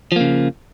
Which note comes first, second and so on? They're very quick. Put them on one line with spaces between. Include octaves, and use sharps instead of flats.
F3 A#3 C#3